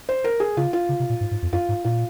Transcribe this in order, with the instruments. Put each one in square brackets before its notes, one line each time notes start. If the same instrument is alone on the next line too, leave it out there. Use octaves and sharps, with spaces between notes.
[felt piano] C5
A#4
G#4
[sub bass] C#3 [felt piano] F4
[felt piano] F4
[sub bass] C#3
C3
A#2
G#2
G#2
F2
[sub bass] F#2 [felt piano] F4
[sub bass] G#2
[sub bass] A#2 [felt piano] F4